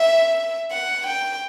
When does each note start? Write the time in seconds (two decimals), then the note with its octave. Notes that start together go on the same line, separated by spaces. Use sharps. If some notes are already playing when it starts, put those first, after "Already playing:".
Already playing: E5
0.71 F#5
1.06 G5